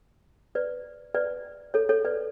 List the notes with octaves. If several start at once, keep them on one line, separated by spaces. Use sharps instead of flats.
B4 D5
B4 D5
A4 C#5
A4 C#5
B4 D5